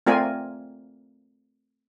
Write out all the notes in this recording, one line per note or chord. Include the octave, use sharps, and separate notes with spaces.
A3 C4 F4 A#4 D5 G#5